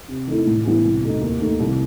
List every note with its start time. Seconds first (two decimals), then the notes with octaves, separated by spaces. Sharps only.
0.08 C3
0.27 D#3 A3 E4
0.46 A2
0.65 E3 G3 B3 E4
0.84 C2
1.03 B2 A3 D#4
1.21 D#2
1.40 D#3 A3 D#4
1.60 C2